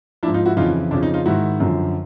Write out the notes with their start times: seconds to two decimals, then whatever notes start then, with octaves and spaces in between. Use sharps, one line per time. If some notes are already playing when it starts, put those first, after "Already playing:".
0.23 F3 D4 E4
0.27 G#2
0.34 D#4 F4
0.46 E4 F#4
0.57 F2 C#3 E3 D#4 F4
0.91 F2 C#3 F3 D4
1.03 D#4
1.14 D#4 F4
1.26 G#2 D#3 E4 F#4
1.60 F#2 D3 F3